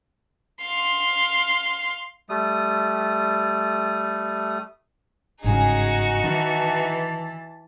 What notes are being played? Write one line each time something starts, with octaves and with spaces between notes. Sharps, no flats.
F5 C6
G3 A3 D#6
G1 G#2 C#3 D#4 F#4 G#4
D#3 E3 A5